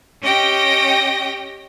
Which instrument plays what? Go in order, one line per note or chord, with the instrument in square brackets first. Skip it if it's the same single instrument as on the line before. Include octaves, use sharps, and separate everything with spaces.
[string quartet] C#4 G4 D#5 G5 A#6